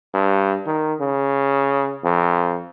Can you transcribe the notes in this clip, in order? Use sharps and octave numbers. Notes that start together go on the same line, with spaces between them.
G2
D#3
C#3
F2